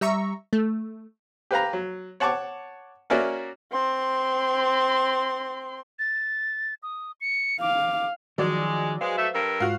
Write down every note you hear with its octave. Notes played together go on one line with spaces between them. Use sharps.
G3 E5 A#5 C#6
A3
G4 B4 F5 A#5
F#3
C#5 F#5 A5 C#6 D6
A#3 C#4 F#4 A#4 D5 E5
C4 C6
A6
D#6
C#7
F5 D6
D#3 F3 F#3 G#3 D5
G#3 B4 C5 F5
A3 A4 E5
G2 A4 A#4
G#2 F4 F#4 F5